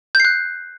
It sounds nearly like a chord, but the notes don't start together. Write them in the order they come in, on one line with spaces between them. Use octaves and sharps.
G6 C7 F#6